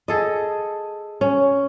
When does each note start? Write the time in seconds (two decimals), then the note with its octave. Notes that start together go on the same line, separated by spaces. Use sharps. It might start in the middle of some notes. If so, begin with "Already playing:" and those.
0.08 G#4 A4 D#5
1.21 C#4